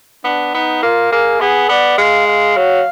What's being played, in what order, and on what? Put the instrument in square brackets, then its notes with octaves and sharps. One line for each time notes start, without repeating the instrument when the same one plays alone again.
[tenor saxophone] B3 [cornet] D4
[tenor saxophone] B3 [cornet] D#4
[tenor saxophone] A#3 [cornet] F4
[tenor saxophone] A#3 [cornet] G#4
[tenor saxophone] B3 [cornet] G#4
[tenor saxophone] B3 [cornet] D5
[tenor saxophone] G#3 [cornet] F5
[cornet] F5
[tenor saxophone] F#3